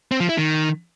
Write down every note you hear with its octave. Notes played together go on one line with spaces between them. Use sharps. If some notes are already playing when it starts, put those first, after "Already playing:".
C4
F3
E4
D#3